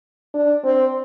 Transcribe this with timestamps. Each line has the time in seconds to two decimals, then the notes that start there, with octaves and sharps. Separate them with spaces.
0.34 D4
0.64 C4